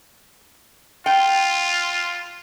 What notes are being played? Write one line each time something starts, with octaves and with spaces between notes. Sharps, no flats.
F4 G5